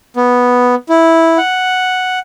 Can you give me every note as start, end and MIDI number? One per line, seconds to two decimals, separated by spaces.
0.17 0.75 59
0.89 1.38 64
1.38 2.19 78